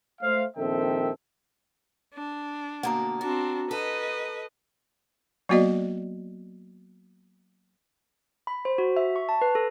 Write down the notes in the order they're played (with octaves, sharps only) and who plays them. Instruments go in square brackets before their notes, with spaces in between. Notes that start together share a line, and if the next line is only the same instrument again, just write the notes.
[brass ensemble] A3 C5 F5
A#1 D#3 C4 A4 E5 G5
[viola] D4
[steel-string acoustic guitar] D2 B2 A#3 [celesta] F#5 A#5
[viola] C4 D4 [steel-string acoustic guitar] F#4
[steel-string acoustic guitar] A4 [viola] B4 D#5
[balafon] F#3 A#3 B3 F#4 D5 D#5
[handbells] B5
C5
F#4
E5
C#6
A5
B4
A4